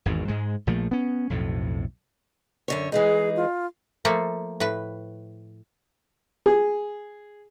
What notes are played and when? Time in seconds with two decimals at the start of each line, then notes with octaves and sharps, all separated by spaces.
0.06 G#1 E2 G#2
0.28 G#2 G#3
0.67 A#1 A#2 F3 A3
0.91 B3 C#4
1.30 B1 F2 A2
2.68 F#2 D3 C#5
2.92 E3 G#3 D#4 G#4
3.36 F4
4.05 F3 A3 A#3
4.60 A2 B4
6.46 G#4